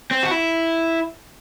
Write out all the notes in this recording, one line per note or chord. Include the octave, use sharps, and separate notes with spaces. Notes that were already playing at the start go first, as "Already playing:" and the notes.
C4
F#4
E4